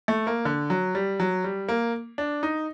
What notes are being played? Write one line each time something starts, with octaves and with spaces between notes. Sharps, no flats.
A3
A#3
D3
F#3
G3
F#3
G3
A#3
D4
D#4